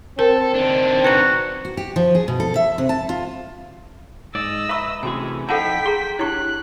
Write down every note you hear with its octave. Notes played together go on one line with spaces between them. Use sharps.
C4 A4 A#4
D#3 D4
F#4 B4 A#5
F#4
G4
F3
G#4
B2
A4
E5
C3
A5
F4
G#2 D5 D#5 E6
B4 E5 A#5 C#6
C3 E3 A3 C#4 F#4 G#4 G#5
F3 D#4 E4 A4 F#5 G5 A5 B6
G#4 A#5 C6
D4 E4 G4 C#5 C#6 F#6